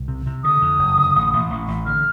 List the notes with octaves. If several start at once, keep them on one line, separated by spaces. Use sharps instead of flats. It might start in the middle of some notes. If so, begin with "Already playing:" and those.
Already playing: C2
C3
C3
D3 D#6
F2
F#1
D3
A1
A1
A1
A1
D3 F6